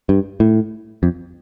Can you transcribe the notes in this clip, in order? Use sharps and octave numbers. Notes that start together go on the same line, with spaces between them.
G2
A2
F2